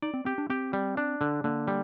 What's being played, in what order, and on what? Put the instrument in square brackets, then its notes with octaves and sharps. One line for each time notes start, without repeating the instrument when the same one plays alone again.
[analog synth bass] D#4 [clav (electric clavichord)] D5
[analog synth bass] C4
[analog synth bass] C4 [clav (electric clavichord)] G4
[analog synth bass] D4
[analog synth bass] C4 [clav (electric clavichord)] G4
[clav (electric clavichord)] G3
D4
D3
[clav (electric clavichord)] D3 [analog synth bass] A#3
[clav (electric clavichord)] G3